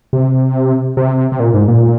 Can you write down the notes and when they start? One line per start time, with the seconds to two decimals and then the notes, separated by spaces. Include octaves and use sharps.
0.13 C3
0.97 C3
1.32 C3
1.40 A#2
1.54 G#2
1.68 A#2